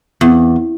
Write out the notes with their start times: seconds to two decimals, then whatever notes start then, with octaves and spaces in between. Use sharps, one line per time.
0.21 E2